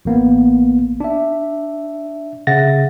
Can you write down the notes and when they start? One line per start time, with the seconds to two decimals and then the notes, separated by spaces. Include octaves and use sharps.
0.05 A1 A#3 B3
1.00 D4 E5
2.47 C#3 E5 F#5 A6 A#6